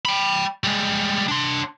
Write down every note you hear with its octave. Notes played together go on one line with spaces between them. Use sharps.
G5 B5
G3 G#3
D4 C6